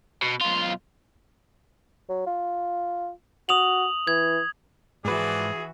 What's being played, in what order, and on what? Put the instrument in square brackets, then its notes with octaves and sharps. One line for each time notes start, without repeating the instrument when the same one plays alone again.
[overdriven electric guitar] B2
B1 F4
[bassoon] F#3
F4
[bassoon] F#4 [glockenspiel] D#6 F7 F#7
[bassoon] E3 [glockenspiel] G#6
[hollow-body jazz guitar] G#2 B4 [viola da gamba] E3 E4 F#4 [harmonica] F3 D5 [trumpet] G#4